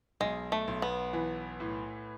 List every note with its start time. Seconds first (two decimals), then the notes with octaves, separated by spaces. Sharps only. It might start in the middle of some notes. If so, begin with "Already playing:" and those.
0.20 B1 G#3
0.52 A3
0.67 B1
0.82 B3
1.13 E3
1.60 A2